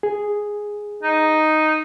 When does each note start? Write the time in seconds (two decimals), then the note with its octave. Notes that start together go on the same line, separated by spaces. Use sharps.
0.03 G#4
1.03 D#4